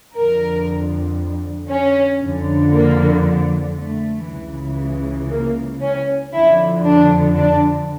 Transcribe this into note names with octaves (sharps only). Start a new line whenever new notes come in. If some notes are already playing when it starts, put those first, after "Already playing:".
F2 D3 A#4
C#4
F2 D3
A#3
A3
C#2 C#3 E3
A#3
C#4
F2 D3 E4
D4
D4